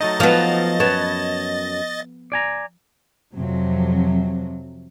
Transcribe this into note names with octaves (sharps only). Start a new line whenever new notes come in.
F#3 A3 D#4 D#5 A6
F3 B3
F#2 B3 C#5 A5
D5 G#5 A#5
F2 C3 F#3